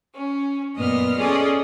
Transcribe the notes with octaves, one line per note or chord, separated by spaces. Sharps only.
C#4
F#2 A#2 B3 D#5 F6
C#4 F4 G#4 A4 D5 D#5